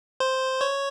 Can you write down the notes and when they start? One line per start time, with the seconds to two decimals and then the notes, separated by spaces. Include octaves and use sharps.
0.20 C5
0.61 C#5